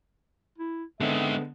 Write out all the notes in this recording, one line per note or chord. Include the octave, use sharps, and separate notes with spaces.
E4
D3 G#3 B3 C4 E5